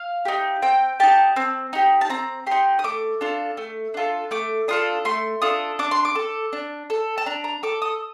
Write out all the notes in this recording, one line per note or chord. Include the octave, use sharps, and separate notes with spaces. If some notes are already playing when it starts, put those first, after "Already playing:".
Already playing: F5
D#4 G4
C4 G5
D#4 G4 A5
C4
D#4 G4
A5
C4 A#5
D#4 G4 C6
D#6
A3 D6
D4 F4 A4
A3
D4 F4 A4
A3 D6
D4 F4 A4 D#6
A3 C6
D4 F4 A4 D#6
D4 D6
C6
D6
A4
D4
A4
A5
D4 A#5
A#5
A4 D6
D#6